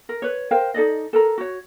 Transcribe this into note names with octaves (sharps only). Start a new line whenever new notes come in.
A#4
B4 C#5
A#4 C5 F5 G5
D#4 A4 D5 D#5
A4 A#4 A#5
F#4 C#5